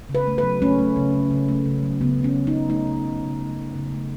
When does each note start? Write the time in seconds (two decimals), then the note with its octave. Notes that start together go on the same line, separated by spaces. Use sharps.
0.09 C#3
0.15 B4
0.27 A3
0.38 B4
0.43 F#3
0.62 A3 C#4
0.79 A3
0.96 C#3
1.14 C#3
1.31 C#3
1.48 A3
1.66 C#3
1.83 F#3
2.01 C#3 B3
2.18 C#3
2.24 C#4
2.35 C#3
2.47 D#4
2.53 C#3
2.70 A3 D#4
2.87 C#3
3.05 C#3
3.23 C#3
3.40 A3
3.58 C#3
3.75 C#3
3.92 A3